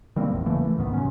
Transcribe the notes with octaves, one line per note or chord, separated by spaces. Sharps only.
D#3 G3 A#3 C4
G#1 E2 A2
C#3 E3 A3 A#3
E3 A3
C2 G#2 D#3 B3
C3 F#3 C#4